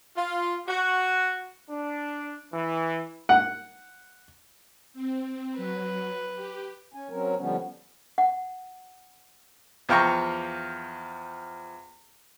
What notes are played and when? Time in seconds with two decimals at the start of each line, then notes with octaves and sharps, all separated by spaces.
0.17 F4
0.68 F#4
1.69 D4
2.53 E3
3.29 F#5
4.94 C4
5.57 F#3 B4
6.35 G4
6.94 C#4 G#5
7.10 F#3 C4 C#4 A#4
7.38 D3 F3 G3 B3 C#4
8.18 F#5
9.89 E2 F3 F5 G5 A#5 C#6